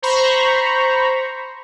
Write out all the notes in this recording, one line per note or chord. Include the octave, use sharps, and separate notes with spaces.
C5 A#5 B5 C#6